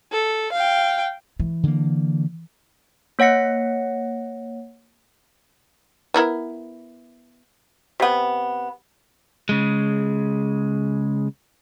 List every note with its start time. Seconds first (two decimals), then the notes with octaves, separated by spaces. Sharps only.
0.12 A4
0.53 F5 G5
1.40 E3
1.63 D3 A#3
3.19 A#3 C#5 F#5 A#6 C#7
6.14 B3 E4 A#4
8.00 C3 B3
9.49 C#3 G#3